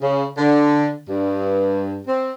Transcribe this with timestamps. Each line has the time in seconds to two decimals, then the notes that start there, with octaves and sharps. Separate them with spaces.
0.02 C#3
0.38 D3
1.09 G2
2.08 C4